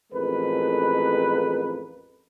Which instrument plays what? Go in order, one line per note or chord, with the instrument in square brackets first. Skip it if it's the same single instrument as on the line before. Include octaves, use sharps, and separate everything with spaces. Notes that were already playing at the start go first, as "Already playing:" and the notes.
[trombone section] A1 F2 G#3 A#4 B4